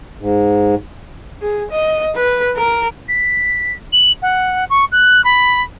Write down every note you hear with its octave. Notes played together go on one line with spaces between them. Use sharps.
G#2
G#4
D#5
B4
A#4
B6
F#7
F#5
C#6
F#6
B5